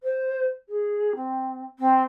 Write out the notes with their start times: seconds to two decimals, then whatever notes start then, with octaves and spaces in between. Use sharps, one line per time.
0.03 C5
0.69 G#4
1.15 C4
1.79 C4